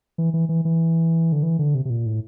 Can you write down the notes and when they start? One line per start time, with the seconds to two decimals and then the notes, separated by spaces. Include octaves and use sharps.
0.18 E3
0.34 E3
0.49 E3
0.65 E3
1.32 D3
1.43 E3
1.59 D3
1.75 C3
1.85 C3
1.90 A#2
2.06 A2